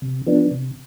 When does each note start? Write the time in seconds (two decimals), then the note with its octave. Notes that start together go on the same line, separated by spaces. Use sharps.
0.02 C3
0.27 F3 B3 D4
0.51 C3